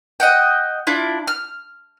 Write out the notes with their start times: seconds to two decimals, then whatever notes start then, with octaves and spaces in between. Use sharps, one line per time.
0.20 D#5 F#5 G5
0.87 D4 E4 F4
1.27 F6